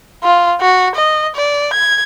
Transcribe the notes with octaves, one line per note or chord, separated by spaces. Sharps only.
F4
F#4
D#5
D5
G#6